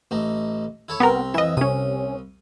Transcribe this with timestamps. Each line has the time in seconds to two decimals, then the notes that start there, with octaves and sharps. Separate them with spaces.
0.11 A1 A3 D#4
0.89 E4 A4 C#5
1.00 C2 B3 C4 A#4 A#5
1.34 F2 E3 D#5 E5
1.57 C2 C3 C#4 D#6